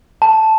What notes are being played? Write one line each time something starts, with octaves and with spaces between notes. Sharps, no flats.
A5